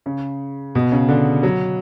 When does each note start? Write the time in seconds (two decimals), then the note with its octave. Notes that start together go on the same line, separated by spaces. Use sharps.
0.06 C#3
0.75 B2
0.92 C#3
1.09 D3
1.43 F#3